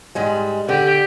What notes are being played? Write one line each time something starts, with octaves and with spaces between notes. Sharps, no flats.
G#2 G3 G#3
D3 G4